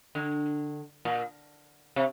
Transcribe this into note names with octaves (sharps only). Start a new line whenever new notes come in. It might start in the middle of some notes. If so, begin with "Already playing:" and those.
D3
A#2
C3